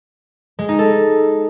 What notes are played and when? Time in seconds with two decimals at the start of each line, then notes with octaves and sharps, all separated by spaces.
0.59 G#3
0.69 D#4
0.79 A4